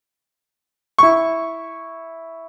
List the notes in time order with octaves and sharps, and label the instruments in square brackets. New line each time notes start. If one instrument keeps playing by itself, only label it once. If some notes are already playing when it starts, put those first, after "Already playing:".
[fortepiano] E4 C#6